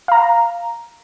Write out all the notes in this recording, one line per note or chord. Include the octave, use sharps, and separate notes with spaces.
F5 A#5